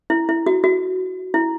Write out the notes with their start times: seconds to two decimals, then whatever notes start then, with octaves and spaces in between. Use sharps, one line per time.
0.10 E4
0.29 E4
0.46 F#4
0.64 F#4
1.34 E4